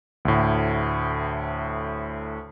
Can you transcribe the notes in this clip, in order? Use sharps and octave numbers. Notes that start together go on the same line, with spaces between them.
D2 A2